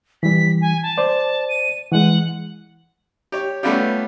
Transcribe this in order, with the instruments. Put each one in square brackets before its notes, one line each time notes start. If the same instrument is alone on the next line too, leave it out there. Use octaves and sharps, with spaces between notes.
[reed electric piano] E3 G3 [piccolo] B6
[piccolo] G#5
A5
[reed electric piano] C5 D5
[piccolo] D#7
[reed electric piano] E3 G#3 [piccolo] F#5
[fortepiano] G4 C#5
G3 A3 B3 C#4 F4 G4